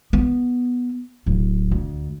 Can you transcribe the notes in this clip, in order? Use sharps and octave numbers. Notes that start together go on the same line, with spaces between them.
B3
D1
D2